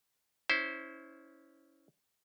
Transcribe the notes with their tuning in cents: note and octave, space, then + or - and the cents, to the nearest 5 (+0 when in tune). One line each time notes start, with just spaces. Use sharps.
C#4 +10 E4 -25 C5 +0